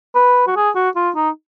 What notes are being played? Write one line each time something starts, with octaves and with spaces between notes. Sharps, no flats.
B4
F#4
G#4
F#4
F4
D#4